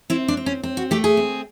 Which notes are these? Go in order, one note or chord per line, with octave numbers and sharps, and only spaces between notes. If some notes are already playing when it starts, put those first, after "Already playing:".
C4 E4
D4
C4
C#4
C4
F#4
A3 G4
G#4
C4